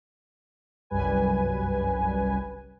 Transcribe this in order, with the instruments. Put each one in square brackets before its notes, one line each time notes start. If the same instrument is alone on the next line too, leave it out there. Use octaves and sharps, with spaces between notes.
[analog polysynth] G1 C2 F#2 G3 B4 G#5